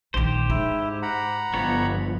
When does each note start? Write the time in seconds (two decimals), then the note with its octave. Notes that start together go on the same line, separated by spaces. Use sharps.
0.14 A#1 D#3 G4 C5
0.50 G#2 D#4 E4
1.02 F#5 A#5 B5
1.53 G1 F3 G3 B3 C#5